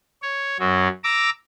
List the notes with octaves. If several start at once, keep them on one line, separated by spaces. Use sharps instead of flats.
C#5
F#2 F#3
A#5 D6 E6